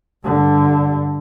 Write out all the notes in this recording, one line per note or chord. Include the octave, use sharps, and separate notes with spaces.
G2 D3